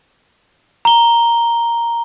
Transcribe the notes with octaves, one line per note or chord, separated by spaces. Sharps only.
A#5 G7